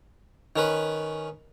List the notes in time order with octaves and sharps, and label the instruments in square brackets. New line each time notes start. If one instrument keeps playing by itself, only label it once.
[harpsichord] D#3 C#4 B4